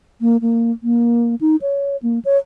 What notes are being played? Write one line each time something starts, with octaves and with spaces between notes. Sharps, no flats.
A#3
A#3
A#3
D#4
C#5
A#3
C#5